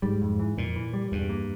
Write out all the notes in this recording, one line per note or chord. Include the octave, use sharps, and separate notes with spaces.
G#2 G3
F2
E3
F2 A#2
E3
G3
E2 G2
A#3